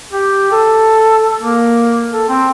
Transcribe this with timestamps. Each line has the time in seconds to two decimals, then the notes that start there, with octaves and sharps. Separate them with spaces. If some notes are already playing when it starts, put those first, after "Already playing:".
0.13 G4
0.52 A4
1.40 A#3
2.13 A4
2.29 C4